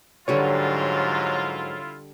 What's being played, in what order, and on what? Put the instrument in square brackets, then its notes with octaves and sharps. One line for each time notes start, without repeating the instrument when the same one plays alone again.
[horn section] G#2 F#3 [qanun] D3 G3 B4 [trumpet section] E4 F4 [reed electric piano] C#5